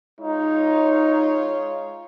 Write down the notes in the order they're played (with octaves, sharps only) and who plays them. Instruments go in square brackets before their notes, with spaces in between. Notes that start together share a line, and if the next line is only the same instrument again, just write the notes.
[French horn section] G#3 F4 C#5 [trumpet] D#4